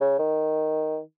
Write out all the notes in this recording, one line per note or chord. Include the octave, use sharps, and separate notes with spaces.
C#3
D#3